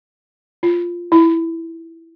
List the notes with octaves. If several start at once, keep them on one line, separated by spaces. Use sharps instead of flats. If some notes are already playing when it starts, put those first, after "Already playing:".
F4
E4